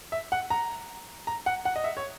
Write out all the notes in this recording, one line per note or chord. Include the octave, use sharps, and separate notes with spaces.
E5
F#5
A#5
A#5
F#5
F#5
D#5
E5
C#5